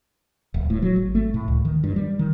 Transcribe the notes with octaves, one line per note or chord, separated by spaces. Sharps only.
D1
A2
F#3
G#1
A3
A2
C#2
D#3
G2
G3
D#3